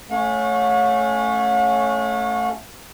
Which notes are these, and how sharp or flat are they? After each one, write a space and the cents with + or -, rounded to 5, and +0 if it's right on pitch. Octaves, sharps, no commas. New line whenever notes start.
A3 +0 C#4 +0 F#5 -45